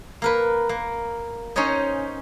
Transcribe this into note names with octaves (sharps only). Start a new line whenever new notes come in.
A#3 A#4 B4
A#3
C#4 D#4 C5 C#5 D#5